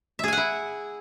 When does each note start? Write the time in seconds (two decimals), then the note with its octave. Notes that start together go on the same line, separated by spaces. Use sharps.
0.19 E5
0.24 G#4
0.28 G#5
0.33 F#5
0.37 E4